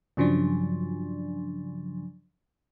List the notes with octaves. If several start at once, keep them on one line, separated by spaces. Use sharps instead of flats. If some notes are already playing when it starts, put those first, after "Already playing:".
G2 C#3 F3 F#3 D4